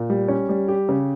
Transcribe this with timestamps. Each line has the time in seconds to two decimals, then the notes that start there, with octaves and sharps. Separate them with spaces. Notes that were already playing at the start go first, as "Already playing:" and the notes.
Already playing: A#2
0.10 G3
0.28 C#4
0.49 G3
0.68 G4
0.89 C#3